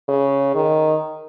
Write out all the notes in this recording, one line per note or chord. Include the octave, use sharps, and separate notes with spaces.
C#3
D#3